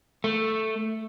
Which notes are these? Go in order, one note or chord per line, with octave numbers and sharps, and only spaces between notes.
A3